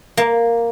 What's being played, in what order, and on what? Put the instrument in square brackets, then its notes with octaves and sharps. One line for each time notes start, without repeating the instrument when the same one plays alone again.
[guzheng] A#3